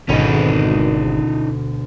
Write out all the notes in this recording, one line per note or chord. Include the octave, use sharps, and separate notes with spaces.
G#1 D2 B2 C#4 D#4 B5